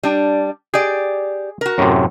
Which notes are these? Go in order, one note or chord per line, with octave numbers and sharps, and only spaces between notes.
G3 D4
G4 G#4 D5
F#4 A#4
F#2 A2 C3